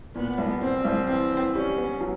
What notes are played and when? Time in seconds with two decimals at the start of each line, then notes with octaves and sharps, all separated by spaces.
0.15 A#2 B3
0.38 C2
0.61 A#2 C4
0.84 C2
1.08 E3 C4
1.31 E3
1.54 G3 C#4
1.78 B3
2.01 F#3